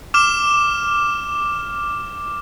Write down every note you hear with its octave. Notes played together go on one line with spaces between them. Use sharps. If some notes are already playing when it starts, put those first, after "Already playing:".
D6 F6 E7